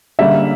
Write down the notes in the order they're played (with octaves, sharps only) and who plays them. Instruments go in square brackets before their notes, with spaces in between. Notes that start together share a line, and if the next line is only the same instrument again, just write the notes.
[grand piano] D3 G3 A#3 C#4 [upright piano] E5